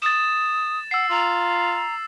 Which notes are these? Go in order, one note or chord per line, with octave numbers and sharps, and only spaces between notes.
D#6 A6 E7
F#5 E6 C7
F4 A#5